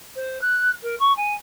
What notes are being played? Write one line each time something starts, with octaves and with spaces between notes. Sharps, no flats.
C5
F#6
A#4
C#6
G#5